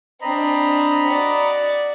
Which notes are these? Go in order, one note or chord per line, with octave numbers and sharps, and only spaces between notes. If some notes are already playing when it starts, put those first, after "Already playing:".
C4 D4 D#5 A#5 B5
F#4 D5